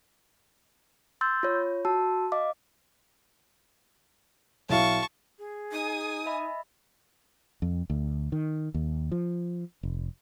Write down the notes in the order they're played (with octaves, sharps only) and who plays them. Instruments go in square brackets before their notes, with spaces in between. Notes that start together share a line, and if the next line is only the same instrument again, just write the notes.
[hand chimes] C6 E6 G6 A6
F4 C#5
F#4 A5 E6
D#5 F5 D6
[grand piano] B1 E4 F5 [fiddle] A5 C#6
[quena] G#4
[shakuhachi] D#4 [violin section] G#5 D#6
[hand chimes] D#5 E5 B5
[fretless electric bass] F2
D2
D#3
D#2
F3
F1